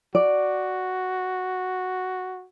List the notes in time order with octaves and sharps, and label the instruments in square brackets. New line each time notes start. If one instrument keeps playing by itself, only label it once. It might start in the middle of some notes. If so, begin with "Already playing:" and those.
[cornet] F#4 [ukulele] D5